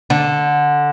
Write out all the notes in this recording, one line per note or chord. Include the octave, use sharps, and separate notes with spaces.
D3